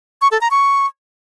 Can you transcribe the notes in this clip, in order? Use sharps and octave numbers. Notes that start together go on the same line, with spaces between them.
C#6
A4
A#5
C#6